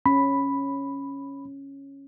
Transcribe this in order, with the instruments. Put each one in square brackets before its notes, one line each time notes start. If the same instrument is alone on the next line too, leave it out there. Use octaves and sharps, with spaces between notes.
[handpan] C#4 [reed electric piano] B5